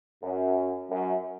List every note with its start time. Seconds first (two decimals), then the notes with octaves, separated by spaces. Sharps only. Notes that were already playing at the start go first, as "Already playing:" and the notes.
0.23 F#2
0.90 F#2